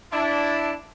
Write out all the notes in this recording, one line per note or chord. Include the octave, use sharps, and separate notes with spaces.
D4 E4